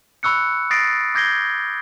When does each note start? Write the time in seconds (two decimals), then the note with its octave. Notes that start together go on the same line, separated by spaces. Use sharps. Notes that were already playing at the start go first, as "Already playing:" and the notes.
0.23 B5 C#6 E6 F#6 C#7
0.71 D#6 A6 A#6 C7 D7
1.15 D6 G6 G#6 A#6 C7 G7